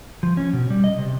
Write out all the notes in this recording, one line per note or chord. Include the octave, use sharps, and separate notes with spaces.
F3
C#4
B2
G3
D#5
C3